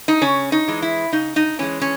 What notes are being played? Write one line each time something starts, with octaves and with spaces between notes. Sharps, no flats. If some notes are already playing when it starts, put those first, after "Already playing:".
D#4
C#3 C#4
D#4
E3 G#3
E4
C#3 D#4
D#4
E3 G#3 C#4
C#4